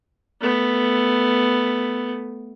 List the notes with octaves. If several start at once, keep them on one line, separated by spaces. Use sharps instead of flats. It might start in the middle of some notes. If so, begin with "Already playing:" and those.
A3 B3